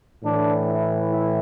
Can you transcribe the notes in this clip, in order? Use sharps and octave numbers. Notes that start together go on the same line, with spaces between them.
A2 E3 D4
E4
E4